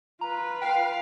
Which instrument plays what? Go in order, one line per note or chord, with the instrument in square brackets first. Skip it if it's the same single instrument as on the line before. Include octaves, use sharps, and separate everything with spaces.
[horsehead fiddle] F4 B4 [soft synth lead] A#5
[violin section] F5 [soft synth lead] G5